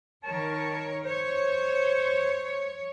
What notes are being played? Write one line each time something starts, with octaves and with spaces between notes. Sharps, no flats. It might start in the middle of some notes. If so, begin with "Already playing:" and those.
D#3 A#4 C#5 A5
C5 C#5